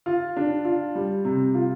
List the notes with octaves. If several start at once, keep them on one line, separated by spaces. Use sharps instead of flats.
F4
D4
F4
G3
C3
F4